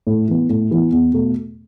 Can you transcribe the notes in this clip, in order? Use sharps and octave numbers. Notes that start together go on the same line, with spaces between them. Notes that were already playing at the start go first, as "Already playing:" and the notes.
A2
E3 B3
A2
E3 B3
E2
B2 A3